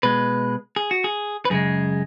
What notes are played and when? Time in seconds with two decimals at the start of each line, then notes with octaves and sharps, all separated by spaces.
0.03 B2 G#3 B4
0.76 G#4
0.91 F#4
1.04 G#4
1.45 B4
1.50 F#2 C#3 G#3 G#4